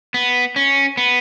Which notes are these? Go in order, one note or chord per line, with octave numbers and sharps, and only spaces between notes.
B3
C#4
B3